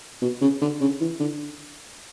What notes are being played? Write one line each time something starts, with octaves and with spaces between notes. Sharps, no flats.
B2
C#3
D3
C#3
E3
D3